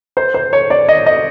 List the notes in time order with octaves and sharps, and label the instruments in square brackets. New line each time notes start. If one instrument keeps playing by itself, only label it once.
[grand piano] C5
C5
C#5
D5
D#5
D#5